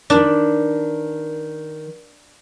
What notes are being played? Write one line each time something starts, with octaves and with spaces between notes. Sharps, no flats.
D#3 D4 B4